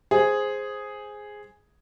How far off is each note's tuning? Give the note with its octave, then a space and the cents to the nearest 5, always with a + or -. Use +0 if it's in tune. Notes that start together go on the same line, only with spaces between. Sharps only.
G#4 +0 C5 +0